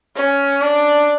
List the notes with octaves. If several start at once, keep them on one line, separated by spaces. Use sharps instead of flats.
C#4
D4